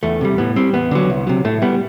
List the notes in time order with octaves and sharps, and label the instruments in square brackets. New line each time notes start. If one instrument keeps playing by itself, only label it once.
[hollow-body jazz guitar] E2 A3
C3 G3
A2 B3
G3 C4
E2 B3
D3 F#3
C2
C3 F#3
A2 A3
G3 B3